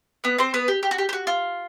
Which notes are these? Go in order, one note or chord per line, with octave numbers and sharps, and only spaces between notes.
B3 B4
C4 C5
B3 B4
G4
G4
F#4
G4
G4
F#4
F4